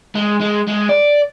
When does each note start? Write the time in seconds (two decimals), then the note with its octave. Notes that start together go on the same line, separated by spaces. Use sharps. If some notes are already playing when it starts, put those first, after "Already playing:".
0.15 G#3
0.41 G#3
0.67 G#3
0.89 D5